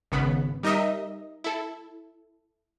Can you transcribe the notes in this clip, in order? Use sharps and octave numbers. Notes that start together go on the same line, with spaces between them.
G#1 C#3 B3 B5
G3 D#4 A#4 D#5 E5
E4 A4